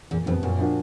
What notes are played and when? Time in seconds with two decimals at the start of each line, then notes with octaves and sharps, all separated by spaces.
0.11 E2 A#2
0.26 F2 G3 B3
0.43 F#2 A#2
0.59 F3 A#3 D4 F#4